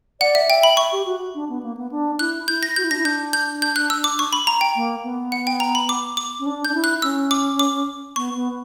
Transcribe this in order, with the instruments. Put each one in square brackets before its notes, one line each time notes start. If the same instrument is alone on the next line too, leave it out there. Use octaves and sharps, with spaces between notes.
[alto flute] D5 [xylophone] F#5
[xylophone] E5
[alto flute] E5 [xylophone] G5
[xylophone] B5
[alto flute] E5 [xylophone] C#6
[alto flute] G4
F#4
D4
B3
A#3
B3
D4
[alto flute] E4 [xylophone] F#6
[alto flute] E4 [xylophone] G6
[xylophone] A#6
[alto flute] F#4 [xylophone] G6
[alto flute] E4
[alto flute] D4 [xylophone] A#6
[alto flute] E4
[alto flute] D4 [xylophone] G6
[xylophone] G6
G6
F#6
E6
D6
C#6
B5
A#5
G5
[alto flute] A#3
B3
[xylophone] F#5
G5
A#5
B5
D6
D6
[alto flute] C#4
D4
[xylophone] G6
[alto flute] D4
E4
[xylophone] F#6
[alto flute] C#4 [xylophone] E6
[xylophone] D6
D6
[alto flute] B3 [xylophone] C#6
[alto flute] B3